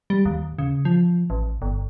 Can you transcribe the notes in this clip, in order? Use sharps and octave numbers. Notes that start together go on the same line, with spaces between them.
G3
D#2
C#3
F3
A1
G1